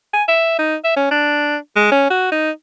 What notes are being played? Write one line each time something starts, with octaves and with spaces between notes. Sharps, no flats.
G#5
E5
D#4
E5
C#4
D4
G#3
C#4
F#4
D#4